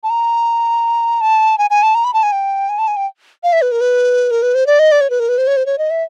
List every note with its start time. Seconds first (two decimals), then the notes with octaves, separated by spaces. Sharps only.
0.03 A5
0.10 A#5
1.21 A5
1.58 G#5
1.70 G#5
1.83 A5
1.95 A#5
2.04 B5
2.14 A5
2.23 G#5
2.32 G5
2.69 G#5
2.78 A5
2.88 G#5
2.97 G5
3.43 F5
3.53 E5
3.62 B4
3.72 A#4
3.81 B4
4.31 A#4
4.42 B4
4.55 C5
4.66 D5
4.79 D#5
4.92 D5
5.01 C#5
5.10 B4
5.20 A#4
5.29 B4
5.38 C5
5.47 C#5
5.57 C5
5.66 C#5
5.78 D#5
5.90 E5